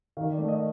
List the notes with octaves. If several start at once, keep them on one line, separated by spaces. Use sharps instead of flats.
D#3 F5
D5
A3
D#5